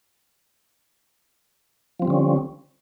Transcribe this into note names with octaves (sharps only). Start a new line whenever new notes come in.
D3 F3 G3 C4 C#4